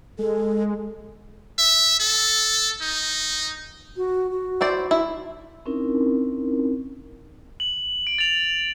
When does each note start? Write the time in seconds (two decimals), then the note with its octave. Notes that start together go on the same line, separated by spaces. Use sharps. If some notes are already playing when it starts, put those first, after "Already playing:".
0.19 G#3 A4
1.59 E5
2.00 A4
2.81 D#4
3.97 F#4
4.31 F#4
4.61 E4 C5 D5
4.91 E4
5.66 C4 C#4 D#4 E4 A#4
7.60 F#7
8.07 D7
8.19 A6 F7